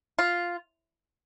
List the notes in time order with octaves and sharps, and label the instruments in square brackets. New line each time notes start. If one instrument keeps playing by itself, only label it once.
[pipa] F4